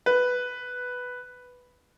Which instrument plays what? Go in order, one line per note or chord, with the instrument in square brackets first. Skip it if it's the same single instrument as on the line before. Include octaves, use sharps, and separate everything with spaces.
[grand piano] B4